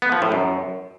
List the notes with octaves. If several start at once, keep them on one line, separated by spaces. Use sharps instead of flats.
B3
F3
A2
F#2